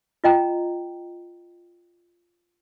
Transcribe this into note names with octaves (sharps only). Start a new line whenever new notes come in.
F4 D#5 G5 A#5